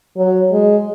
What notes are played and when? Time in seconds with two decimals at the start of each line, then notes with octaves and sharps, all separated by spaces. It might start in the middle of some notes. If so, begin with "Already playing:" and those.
0.18 F#3
0.52 G#3